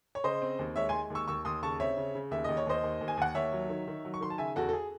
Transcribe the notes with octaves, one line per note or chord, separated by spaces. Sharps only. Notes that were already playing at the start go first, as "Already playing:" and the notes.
C#5
C#3 C5 D#5
C4
D#2
G#3 C#5 E5
G#3 G#5 C6
D#2
C#6 E6
D#2 C#6 E6
D#2 C6 D#6
C#3 A5 C#6
C4 C#5 E5
C#3
C#3
D#2 E5
D#2 D#5
C#5
D#2 C5 D#5
D#2
D#2
G#5
D#2 F#5
D#2 C#5 E5
F#3
D#3
D#3
F#3
C#6
D#3 C6
A5
C#3 E5 G#5
E2 F#4 A4
A4
G#4